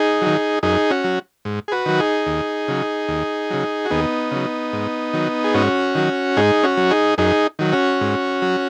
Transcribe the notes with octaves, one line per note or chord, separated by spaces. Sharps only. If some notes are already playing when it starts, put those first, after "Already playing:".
Already playing: D#4 G#4
D#3 F#3
F#2 D#4 G#4
C#4 F#4
F#3
G#2
G#4
F#4 B4
D#3 F#3
D#4 G#4
D#2
C#3 F#3
D#2
C#3 F#3
F#4
D#2 B3 D#4
C#3 F#3
G#2
D#3 F#3
G#4
G#2 C#4 F#4
D#3 F#3
G#2 D#4 G#4
C#4 F#4
F#3
D#4 G#4
F#2 D#4 G#4
D#3 F#3
C#4 F#4
G#2
F#3